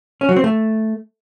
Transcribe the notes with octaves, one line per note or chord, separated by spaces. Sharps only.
C#4
F#3
C4
A3